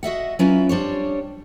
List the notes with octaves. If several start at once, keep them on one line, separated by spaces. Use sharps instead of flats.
F#4 D#5 E5 F#5
F#3 C#4 E4 F4 B4
G3 D4 C5 C#5